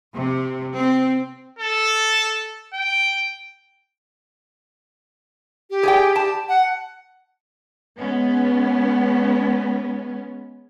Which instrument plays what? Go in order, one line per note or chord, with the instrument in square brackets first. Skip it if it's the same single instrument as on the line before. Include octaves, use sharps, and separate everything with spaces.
[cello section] C3
C4
[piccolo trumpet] A4
G5
[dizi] G4
[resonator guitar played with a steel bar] G#4 D5 G5
A5
[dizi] F#5
[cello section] G#3 B3 C#4